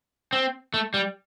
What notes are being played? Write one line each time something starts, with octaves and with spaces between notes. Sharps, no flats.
C4
A3
G3